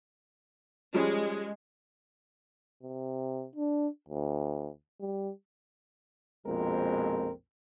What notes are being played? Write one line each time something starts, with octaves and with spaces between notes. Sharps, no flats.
F3 G3 G#3 C#4
C3
D4
D2
G3
A#1 F2 B2 G#3 C4 A#4